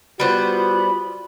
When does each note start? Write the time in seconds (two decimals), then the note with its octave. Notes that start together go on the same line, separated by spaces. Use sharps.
0.20 G3 B3 F4 F#4 C5 B5